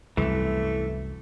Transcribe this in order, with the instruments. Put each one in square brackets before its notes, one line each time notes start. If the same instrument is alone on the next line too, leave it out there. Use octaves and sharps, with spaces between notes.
[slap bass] C2 F#2 [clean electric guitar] E3 [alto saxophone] A3